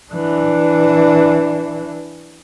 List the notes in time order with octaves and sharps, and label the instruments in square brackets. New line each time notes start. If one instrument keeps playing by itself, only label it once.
[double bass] E3 D4